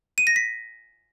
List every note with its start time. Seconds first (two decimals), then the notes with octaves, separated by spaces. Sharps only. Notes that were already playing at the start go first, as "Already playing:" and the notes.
0.18 D#7
0.27 A#6
0.36 B6